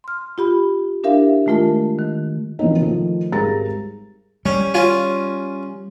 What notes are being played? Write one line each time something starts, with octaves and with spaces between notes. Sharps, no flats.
C6 F6
F4 G4 B5
D4 E4 G4 A#4 E5 F5
D#3 G#3 A3 F4 A#4 A5
D#3
E3 F3 A#3 C4 D#4
D#3 F3 A3
G#1 G3 G#4 A#4 A#5 A6
G3 C#4
C#4 F4